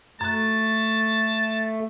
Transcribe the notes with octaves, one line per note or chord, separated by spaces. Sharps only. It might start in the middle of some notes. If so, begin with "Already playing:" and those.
F#2 A3 A5 F#6